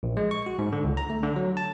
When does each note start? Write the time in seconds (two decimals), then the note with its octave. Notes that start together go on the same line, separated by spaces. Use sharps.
0.03 A#1
0.17 G#3
0.31 C#6
0.46 F#4
0.59 G#2
0.72 D3
0.84 C#2
0.97 A#5
1.10 A3
1.23 D3
1.36 F#3
1.57 A5